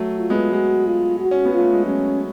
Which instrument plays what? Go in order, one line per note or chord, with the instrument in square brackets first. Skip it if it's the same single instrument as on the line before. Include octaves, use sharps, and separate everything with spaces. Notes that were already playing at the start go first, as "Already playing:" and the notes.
Already playing: [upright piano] F#3 A3
[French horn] F4
[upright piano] G#3 B3
[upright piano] G#3 [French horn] F#4
[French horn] F4
F#4
[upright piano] C#4
B3
[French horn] F4
[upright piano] A3
G#3
[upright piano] F#3 [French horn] C#4